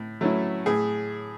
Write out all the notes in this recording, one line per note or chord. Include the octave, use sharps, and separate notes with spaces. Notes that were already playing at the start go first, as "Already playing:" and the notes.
Already playing: A2
F#3 A3 C#4 E4
A2 G#4